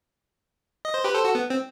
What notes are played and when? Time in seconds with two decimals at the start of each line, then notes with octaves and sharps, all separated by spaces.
0.85 D#5
0.94 C5
1.04 G4 B4
1.14 A4 C5
1.25 F#4 A4
1.35 B3
1.50 C4